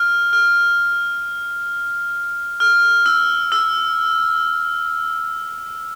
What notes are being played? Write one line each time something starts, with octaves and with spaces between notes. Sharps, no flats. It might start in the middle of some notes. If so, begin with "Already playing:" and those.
Already playing: F6
F6
F6
E6
E6